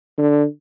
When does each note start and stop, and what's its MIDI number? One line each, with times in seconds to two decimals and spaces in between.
0.18 0.45 50